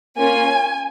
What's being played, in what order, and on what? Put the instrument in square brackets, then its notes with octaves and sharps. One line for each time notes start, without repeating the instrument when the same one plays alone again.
[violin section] A#3 C#4 F4 G#5